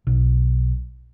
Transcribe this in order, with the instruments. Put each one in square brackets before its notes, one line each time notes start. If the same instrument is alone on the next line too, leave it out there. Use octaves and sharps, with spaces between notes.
[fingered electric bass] B1